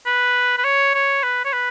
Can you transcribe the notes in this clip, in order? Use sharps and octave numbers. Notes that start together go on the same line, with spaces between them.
B4
B4
C#5
C#5
B4
C#5
B4